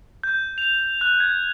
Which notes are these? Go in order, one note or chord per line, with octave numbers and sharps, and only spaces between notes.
G6
F7
F#6
G#6